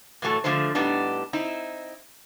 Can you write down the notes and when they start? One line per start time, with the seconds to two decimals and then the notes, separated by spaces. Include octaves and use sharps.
0.22 A2 E3 F#3 A3 A4
0.44 D3 F3 G#3 A3 C5
0.75 A2 G3 B3 D4 D#4
1.33 C4 D#4 E4